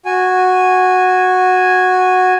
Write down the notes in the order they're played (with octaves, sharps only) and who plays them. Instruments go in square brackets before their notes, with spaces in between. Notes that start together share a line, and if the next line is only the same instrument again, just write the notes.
[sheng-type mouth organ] F#4 G#5